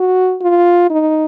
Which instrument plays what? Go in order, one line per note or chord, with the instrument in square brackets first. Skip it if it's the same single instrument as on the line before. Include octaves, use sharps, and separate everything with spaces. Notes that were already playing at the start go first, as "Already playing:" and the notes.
Already playing: [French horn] F#4
F4
D#4